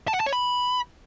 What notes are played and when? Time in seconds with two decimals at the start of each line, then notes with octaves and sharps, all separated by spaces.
0.08 A5
0.14 F#5
0.20 A5
0.26 C#5
0.33 B5